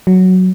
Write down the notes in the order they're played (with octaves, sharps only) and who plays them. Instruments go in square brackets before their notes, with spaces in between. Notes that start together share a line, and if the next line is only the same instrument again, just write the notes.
[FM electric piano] F#3